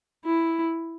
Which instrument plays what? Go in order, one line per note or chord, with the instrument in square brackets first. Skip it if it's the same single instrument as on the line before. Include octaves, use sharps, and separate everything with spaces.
[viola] E4